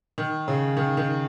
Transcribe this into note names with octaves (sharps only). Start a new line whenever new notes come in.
D#3
C#3
D#3
D#3